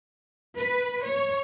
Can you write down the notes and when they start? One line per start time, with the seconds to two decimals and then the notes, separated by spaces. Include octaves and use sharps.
0.58 B4
1.05 C#5